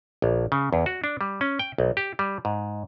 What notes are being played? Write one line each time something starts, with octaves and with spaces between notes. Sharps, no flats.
A#1
C#3
E2
F#4
D4
G3
C#4
G5
B1
G4
G3
G#2